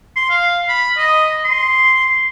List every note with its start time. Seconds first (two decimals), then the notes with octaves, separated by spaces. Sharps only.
0.16 C6
0.30 F5
0.69 B5
0.98 D#5
1.45 C6